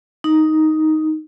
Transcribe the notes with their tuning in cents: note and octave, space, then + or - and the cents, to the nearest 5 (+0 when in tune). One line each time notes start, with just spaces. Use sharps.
D#4 +5